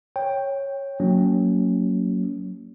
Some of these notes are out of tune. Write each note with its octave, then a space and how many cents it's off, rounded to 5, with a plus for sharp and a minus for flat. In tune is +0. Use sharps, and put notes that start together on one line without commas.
C#5 -10 G5 +5
F#3 +0 A#3 -15 C#4 +30